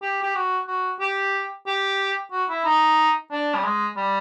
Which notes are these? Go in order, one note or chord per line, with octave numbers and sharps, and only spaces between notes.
G4
G4
F#4
F#4
G4
G4
F#4
E4
D#4
D4
G3
G#3
G3